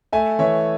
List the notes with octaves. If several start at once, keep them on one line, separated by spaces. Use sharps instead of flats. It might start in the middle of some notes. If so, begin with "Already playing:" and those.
A3 E5 G#5
E3 C#5 E5